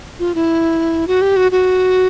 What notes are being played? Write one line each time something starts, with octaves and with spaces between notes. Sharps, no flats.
F4
E4
F#4
G4
F#4
F#4